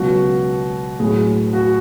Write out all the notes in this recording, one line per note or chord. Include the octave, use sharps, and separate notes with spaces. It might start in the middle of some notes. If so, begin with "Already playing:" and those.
Already playing: C#2 B2 F#3 F#4
A2 F#3 G#4
F#4